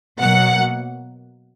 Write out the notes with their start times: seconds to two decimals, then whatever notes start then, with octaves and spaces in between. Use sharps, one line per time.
0.20 B2 F#3 A#3 F#5